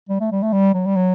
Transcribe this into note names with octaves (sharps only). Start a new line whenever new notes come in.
G3
A3
G3
A3
G3
F#3
G3
F#3